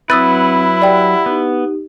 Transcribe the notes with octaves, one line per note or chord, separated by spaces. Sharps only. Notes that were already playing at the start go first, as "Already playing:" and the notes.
F#3 C4 E4 B4 D#6 E6 A6
G4 D5 F#5 G5
B3 D#4 G4